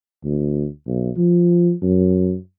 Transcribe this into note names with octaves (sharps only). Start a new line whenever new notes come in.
D2
B1
F3
F#2